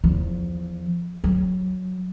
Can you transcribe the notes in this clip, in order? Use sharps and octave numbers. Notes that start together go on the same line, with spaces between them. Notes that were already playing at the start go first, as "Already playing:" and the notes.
E2 F3
F#3